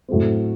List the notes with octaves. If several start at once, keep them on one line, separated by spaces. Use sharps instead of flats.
A2 F#3 A3 C4